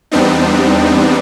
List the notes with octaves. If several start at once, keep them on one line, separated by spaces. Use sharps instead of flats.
E2 G3 B3 C4 D4 D#4